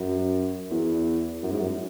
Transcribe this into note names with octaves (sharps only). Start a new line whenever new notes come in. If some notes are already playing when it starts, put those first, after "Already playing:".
Already playing: F#2
E2
F#2
G#2
F#2